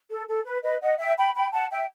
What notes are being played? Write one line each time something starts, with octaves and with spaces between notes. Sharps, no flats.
A4
A4
B4
B4 D#5
D#5 F#5
E5 G5
G5 B5
G5 B5
F#5 A5
E5 G5